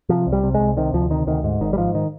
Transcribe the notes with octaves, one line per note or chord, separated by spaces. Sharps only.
C3 F3
C2
G3
C3
G#3
C2
C3 D#3
D2 F3
C3 D#3
D2 D#3
G#2
G#1 D#3
G3
G#2 F3
D#3